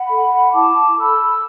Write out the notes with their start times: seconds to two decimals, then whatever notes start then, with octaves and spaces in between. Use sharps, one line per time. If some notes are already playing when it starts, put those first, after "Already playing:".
Already playing: F#5 B5
0.09 A4
0.53 E4 A5 D6
0.97 A4 B5 E6